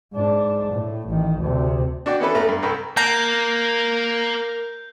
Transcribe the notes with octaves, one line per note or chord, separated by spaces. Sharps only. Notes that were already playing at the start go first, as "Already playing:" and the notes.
G#2 D4
A2
A1 D#3
D2 C3
D4 F#4 D5 G5
B3 C#4 D4 E4 A4 B4
A1 A3 B3 B4 A#5
G2
C2 A4 B4 G5 A#5
A#3 A#4 A#5 G6